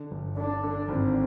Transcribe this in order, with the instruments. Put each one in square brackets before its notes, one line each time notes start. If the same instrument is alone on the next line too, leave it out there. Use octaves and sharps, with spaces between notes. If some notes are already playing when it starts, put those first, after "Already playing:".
Already playing: [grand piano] D3
G1
[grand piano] D3 [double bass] D4
[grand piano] D3
[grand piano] G#1 [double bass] C4